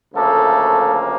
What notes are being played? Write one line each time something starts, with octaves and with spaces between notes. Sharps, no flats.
D2 C#3 F3 A3 A#3 A4